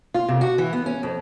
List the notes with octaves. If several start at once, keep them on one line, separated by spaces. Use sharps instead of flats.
F4
C3
F#4
E3
B3
C#4
F2